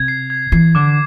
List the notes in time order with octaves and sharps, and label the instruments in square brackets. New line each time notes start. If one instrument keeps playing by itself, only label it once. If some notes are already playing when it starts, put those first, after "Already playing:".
Already playing: [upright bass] C3 [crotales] G#6
[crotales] C7
G#6
[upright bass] E3 [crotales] C7
[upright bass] D3 [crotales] D6